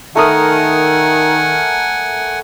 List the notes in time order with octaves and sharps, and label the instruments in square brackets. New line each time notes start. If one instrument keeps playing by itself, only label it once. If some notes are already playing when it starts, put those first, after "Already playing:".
[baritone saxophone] D#3 [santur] A3 A#4 D#6 [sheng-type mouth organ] F#5 G#5